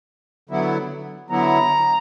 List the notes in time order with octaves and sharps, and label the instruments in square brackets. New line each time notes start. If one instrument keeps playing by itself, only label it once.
[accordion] D3 F#3 B3 E4
[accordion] D3 F#3 B3 E4 [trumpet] A#5